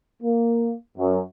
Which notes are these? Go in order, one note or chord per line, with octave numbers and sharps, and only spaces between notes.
A#3
F#2